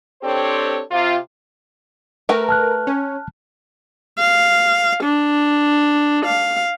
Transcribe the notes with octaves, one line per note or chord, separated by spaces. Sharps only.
C4 D4 G4 A4 C5 C#5
C3 F4
A3 A#4 B4 G5
A5 F6 F#6
C#4
F5
D4
F5